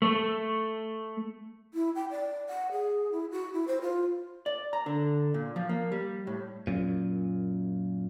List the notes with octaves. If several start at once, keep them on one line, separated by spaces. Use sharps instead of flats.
A3
E4
G5
D5
F#5
G#4
E4
F#4
E4
C5
F4
D5
A#5
D3
A#2
F3
A#3
G3
A2
F#2 A#2